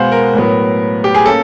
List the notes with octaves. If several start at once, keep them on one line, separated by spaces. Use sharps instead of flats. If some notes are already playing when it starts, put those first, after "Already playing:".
Already playing: B2 G#3 B3 C5 F5 F#5 G#5
A#4
A2 F#3 B3
G4
G#4
A#3 C#4 A4